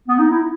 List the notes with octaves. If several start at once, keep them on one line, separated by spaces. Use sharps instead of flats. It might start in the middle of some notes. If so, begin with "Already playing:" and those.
B3
D#4
E4